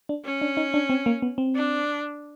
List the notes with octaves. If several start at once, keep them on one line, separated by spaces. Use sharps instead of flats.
D4
C#4
D4
D#4
D4
C4
A#3
B3
C4
D4